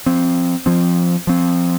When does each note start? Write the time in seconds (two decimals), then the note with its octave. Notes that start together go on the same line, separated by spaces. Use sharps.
0.06 F3 C4
0.66 F3 C4
1.27 F3 C4